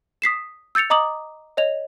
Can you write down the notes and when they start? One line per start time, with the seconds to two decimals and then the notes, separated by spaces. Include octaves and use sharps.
0.22 D#6 B6 C7 E7
0.75 E6 G6 A6 C#7 F7
0.90 D#5 A#5 D6 D#6 F#7
1.57 C#5 D#5 F7